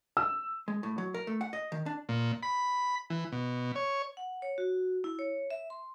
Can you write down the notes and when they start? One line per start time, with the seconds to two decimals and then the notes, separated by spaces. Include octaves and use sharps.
0.17 E6
0.68 G#3
0.83 A2
0.98 F#3
1.14 A#4
1.27 A3
1.41 F#5
1.53 D#5
1.72 D#3
1.86 D4
2.09 A#2
2.43 B5
3.10 E3
3.32 B2
3.75 C#5
4.17 F#5
4.42 C#5
4.58 F#4
5.04 E4
5.19 C#5
5.51 E5
5.70 C6